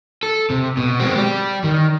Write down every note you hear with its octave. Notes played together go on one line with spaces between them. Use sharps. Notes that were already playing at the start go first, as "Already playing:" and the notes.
A4
C3
B2
G#3 C4
G4 D5
D#3